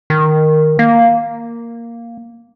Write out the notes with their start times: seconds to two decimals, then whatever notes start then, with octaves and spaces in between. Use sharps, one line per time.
0.10 D#3
0.79 A#3